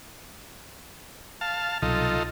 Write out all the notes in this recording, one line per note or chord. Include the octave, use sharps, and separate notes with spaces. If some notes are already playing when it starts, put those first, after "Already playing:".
F5 A5
C2 B2 F#3 D#4 F4 A4